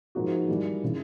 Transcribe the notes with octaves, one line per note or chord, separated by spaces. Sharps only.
G#2 F3 A#3 D#4 F#4
E3 G3 A#3
C#3 E3